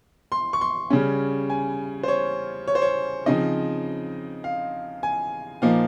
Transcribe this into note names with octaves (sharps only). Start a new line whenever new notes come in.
C6
C#6
C6
C#3 G3 C#4
G#5
C5
C#5
C#5
C5
C#5
C#3 F3 C4 D#4 D#5
F5
G#5
A#2 F3 A#3 D#4 F5